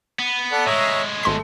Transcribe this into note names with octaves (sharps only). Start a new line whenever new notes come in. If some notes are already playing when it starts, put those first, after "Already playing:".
B3
A4 D5 F#5
A2 G#3 C#5 E5 A#5
G#1 A3 C6 B6